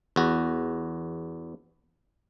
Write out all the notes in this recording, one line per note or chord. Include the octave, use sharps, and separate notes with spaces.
E2 F#4